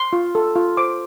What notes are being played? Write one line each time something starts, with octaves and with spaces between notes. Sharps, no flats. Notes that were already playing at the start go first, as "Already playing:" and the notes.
Already playing: C6
F4
A4
F4
C5 D6